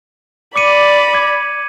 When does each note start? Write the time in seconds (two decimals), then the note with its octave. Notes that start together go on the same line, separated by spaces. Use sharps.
0.56 D5 B5 D6 C#7 D#7
1.13 D6 G#6